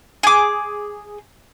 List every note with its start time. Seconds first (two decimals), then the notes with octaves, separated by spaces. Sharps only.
0.23 G#4 D6